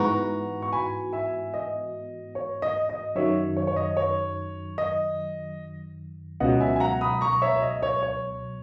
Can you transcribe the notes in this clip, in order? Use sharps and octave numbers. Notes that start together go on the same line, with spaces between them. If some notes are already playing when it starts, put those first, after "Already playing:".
Already playing: G#2 E3 B3 F#4 A#5 C#6
C#6
G#5 B5
E5 G#5
D#5
C#5
D#5
D#5
F#2 D#3 F#3 C#5 E5
C#5
C#5
D#5
C#5
D#5
C#2 B2 F#3 D#5 F#5
E5 G#5
G#5
F#5 A#5
B5 D#6
A#5 C#6
C#5 E5
D#5
C#5
C#5